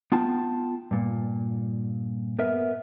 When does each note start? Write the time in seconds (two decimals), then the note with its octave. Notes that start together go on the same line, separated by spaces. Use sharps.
0.12 B3 F4 G5 A5
0.91 G2 A#2
2.39 B3 A#4 E5